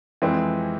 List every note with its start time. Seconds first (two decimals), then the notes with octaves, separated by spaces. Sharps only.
0.22 F2 E3 G#3 C4